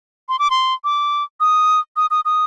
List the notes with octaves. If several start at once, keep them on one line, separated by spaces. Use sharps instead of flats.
C6
D6
C6
D6
D#6
D#6
D#6
D#6